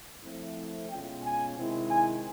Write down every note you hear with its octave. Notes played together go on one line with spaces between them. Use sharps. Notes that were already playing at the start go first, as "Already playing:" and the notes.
F3 A3 C4 E4
B2 G#3 C#4 F4 G5
G#5
C3 D#3 G#3 C4 E4
G#5